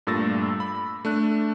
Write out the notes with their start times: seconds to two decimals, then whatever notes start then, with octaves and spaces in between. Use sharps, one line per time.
0.07 G2 A#2 A3 E6 A6 A#6
0.60 B5
1.05 A3 D4 F#6